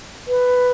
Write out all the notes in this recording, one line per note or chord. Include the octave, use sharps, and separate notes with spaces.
B4